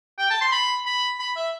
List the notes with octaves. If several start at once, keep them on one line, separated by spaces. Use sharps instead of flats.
G5
A5
C6
B5
B5
B5
E5